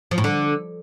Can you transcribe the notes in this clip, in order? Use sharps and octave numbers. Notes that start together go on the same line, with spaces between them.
F3
A2
D3